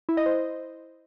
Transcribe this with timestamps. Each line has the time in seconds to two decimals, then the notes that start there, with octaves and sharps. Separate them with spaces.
0.09 E4
0.17 D#5
0.26 C5